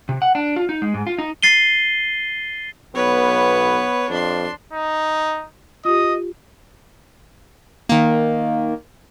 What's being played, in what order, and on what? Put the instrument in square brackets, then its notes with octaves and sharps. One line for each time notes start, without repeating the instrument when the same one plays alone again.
[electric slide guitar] C3
F#5
D4
F4
D#4
G#3
G#2
F4
D#4
[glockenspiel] A6 C7 D#7 G7
[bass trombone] B1 [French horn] B3 [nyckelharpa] B4 C#5
[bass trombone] F2 [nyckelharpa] D4 C6
[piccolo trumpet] D#4
[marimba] F4 G4 [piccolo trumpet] D#5 [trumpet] D#6
[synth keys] D#3 A#3